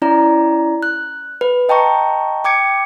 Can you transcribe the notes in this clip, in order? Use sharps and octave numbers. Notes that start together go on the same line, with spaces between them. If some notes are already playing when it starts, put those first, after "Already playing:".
C#4 E4 D5 A#5
F#6
B4
D#5 G5 A5 A#5 C#6
G5 D6 G#6 C#7 D7